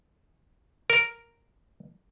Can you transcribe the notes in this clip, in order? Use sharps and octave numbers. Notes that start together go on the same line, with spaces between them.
A#4